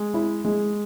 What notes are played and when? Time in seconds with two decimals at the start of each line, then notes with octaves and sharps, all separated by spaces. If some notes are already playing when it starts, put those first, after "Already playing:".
Already playing: G#3
0.14 E4
0.45 G#3